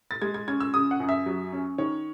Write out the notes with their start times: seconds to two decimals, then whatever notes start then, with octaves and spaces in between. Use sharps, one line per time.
0.11 A6
0.22 G#3 G#6
0.34 G#6
0.48 C#4 G#6
0.60 E6
0.74 C#3 D#6
0.91 F#5
1.00 F#2
1.09 E5
1.26 F#3
1.53 C#4
1.78 D#3 C#5